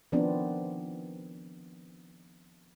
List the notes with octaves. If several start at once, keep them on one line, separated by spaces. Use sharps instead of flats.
D#3 F3 B3 C4 D4